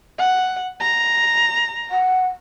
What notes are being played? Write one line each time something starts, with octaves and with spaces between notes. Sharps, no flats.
F#5
A#5
F#5